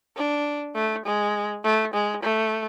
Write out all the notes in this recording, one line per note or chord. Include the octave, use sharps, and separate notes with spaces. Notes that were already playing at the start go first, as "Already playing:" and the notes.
D4
A3
G#3
A3
G#3
A3